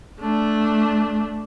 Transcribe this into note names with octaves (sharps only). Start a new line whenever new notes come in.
A3 D4